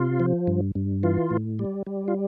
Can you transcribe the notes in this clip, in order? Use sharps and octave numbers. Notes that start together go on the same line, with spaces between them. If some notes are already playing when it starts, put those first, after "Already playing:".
Already playing: C3 F4
F3
G2
G2
E3 F4
A2
G3
G3
F4